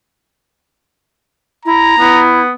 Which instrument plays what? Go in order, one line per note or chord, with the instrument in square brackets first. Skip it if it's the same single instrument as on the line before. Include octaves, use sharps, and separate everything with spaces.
[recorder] E4 [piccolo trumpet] A#5
[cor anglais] B3 [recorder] E4